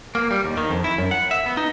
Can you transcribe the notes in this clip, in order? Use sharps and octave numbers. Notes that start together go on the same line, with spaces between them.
A#3
G3
D#2
D#3
F2
E4
F#2
F#5
E5
B3
D#4